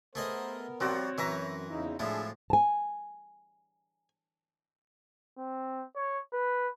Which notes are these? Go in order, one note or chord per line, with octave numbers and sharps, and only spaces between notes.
A3 B3 G#4 A#4 C5 D#5
F3 G3 C4 F#4 C#5
F#2 E3 B4 E5 A#5
E2 C#3 D#4 E4
A2 F3 G#3 D4 F4 G#4 E5
G#5 A5
C4
C#5
B4